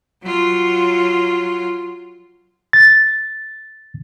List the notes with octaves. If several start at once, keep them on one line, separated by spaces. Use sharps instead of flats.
F#3 F4
A6